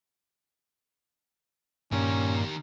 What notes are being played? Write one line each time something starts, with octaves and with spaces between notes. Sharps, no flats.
G2 A#2 D#3 C#4 G4